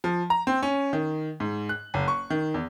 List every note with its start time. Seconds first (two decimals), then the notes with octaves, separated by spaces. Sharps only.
0.04 F3
0.30 A#5
0.47 C4
0.63 C#4
0.93 D#3
1.40 G#2
1.69 F#6
1.94 F#1
2.08 C#6
2.30 D#3
2.54 E2